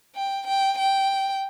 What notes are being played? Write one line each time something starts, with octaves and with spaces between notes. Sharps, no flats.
G5
G5
G5